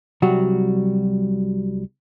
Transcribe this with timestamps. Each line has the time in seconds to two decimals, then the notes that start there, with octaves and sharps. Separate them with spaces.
0.22 C2 F#3 G3 F#4